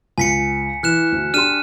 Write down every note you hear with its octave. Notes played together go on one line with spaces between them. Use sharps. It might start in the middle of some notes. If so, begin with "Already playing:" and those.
C#2 G#5 B6 C#7
E3 F6 F#6 E7
D2
D4 G4 C6 F6 D#7 E7